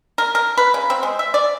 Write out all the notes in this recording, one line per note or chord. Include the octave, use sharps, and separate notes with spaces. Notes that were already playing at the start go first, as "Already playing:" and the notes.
A#4
A#4
B4
C#3
C4
G#3
E5
D5